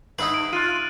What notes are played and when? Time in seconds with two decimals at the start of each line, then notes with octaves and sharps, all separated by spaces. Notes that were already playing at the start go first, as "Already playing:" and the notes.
0.19 G2 D#4 E4 B4 F#7
0.34 D7
0.53 F4 F#6 D#7